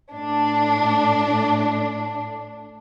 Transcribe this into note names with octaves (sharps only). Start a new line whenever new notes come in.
A2 D4